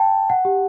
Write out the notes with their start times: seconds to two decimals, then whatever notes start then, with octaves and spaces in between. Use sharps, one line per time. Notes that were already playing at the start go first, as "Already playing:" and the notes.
Already playing: G5 A5
0.30 F#5
0.45 G4